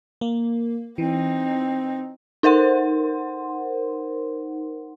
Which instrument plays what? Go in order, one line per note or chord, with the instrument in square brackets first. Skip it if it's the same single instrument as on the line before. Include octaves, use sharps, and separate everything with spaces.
[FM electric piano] A#3
[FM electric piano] E3 [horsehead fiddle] C4 D#4
[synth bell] D#4 A#4 C5 F#5 C6